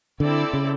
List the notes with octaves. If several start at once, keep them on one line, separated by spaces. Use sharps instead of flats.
D3 C4 E4 A4 D5
C#3